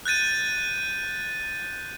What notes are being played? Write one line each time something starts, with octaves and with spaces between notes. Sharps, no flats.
F#6 G6 A6 D#7